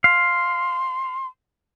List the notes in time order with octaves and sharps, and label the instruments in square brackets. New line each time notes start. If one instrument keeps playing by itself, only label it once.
[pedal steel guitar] F5 [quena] C6